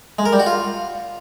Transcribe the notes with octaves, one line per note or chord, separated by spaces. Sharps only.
G#3
A#4
G3
F#4
F4